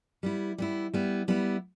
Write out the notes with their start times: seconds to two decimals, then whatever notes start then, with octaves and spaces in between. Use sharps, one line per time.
0.23 G3 B3 E4
0.58 G3 B3 E4
0.94 G3 B3 E4
1.28 G3 B3 E4